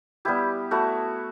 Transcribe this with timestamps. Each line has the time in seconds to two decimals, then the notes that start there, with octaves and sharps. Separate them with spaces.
0.25 G3 B3 E4 G4
0.71 A3 E4 F#4